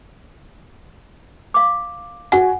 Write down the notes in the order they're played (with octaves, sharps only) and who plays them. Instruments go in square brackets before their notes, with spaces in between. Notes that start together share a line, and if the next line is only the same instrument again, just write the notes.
[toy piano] F5 D6
[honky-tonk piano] F#4 G#5 [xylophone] F#5